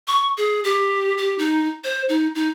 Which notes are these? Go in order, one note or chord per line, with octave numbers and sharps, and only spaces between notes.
C#6
G#4
G4
G4
D#4
C5
D#4
D#4